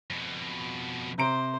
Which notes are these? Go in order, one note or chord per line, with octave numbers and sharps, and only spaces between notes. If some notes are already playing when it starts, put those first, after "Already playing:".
F2 B2
C3 C5 A#5 D7